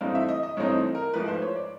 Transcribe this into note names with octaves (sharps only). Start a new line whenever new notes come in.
G2 E3 A3 C4 D#4 F5
E5
D#5
D#5
G2 E3 A3 C4 D#4 C#5
A#4
G#2 F3 A3 B4
C5
C#5
D5